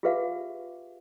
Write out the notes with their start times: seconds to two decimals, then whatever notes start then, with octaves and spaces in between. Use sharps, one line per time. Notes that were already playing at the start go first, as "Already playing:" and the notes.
0.03 F4 G4 G#4 B4 E5 F5